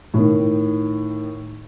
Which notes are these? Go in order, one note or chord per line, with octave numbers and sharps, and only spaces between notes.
A2 D#3